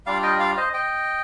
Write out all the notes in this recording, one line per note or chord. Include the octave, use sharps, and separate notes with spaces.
G3 D4 F4 D5 F5
D#5 G5
D5 F5
C5 D#5
D#5 G5